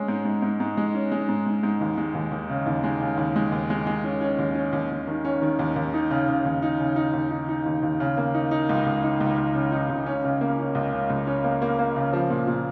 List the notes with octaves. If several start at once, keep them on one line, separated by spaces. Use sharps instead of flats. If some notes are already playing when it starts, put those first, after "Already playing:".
Already playing: G#3 C#4
G#2
G#2
G#2
G#2
G#3
C#4
G#3
G#2
G#2
G#2
D#2
G#3
D#2
D#2
C#3
D#2
G#3
C#3
D#2
G#3
D#2
G#3
G#3
C#4
C#4
D#2
C#4
D#2
D#2
D#3
C#4
D#3
D#2
D#2
D#4
C#3
C#3
D#2
D#4
C#3
D#4
D#2
D#4
D#4
D#2
D#2
C#3
A#3
D#4
D#4
C#2
C#2
D#4
C#2
C#2
C#3
D#4
C#2
C#4
C#3
A#3
C#4
C#2
C#3
C#2
C#4
A#3
A#3
A#3
C#3
F3
A#2
A#2